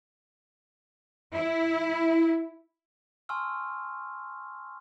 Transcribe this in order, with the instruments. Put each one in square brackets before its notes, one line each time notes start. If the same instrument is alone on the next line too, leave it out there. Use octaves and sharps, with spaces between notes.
[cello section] E4
[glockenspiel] G#5 A5 C6 C#6 E6 F6